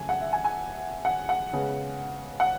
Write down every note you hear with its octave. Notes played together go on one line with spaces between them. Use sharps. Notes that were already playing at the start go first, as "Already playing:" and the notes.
Already playing: C#3 F#3 A3 G#5
F#5
E5
G#5
G#5
F#5
F#5
C#3 G#3 B3
F#5